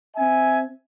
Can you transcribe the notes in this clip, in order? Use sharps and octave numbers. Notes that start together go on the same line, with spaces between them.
C4 E5 G#5